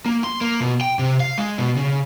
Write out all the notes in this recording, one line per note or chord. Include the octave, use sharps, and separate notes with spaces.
A#3
C6
A#3
B2
G5
C3
F5
G#3
B2
C#3